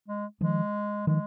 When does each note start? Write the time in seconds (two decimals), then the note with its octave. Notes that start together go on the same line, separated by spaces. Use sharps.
0.08 G#3
0.41 D#3 F3 G#3
1.07 D#3 F3 G#3